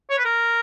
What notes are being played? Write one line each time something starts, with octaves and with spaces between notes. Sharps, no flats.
C#5
B4
A#4